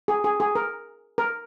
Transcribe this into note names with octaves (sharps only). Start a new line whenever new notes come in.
G#4
G#4
G#4
A#4
A#4